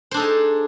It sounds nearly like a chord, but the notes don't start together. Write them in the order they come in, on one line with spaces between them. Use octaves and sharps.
C5 D4 A4 D#4 G#4